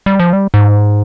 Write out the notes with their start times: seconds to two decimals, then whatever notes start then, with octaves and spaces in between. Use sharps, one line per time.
0.06 G3
0.19 F3
0.33 G3
0.54 G#2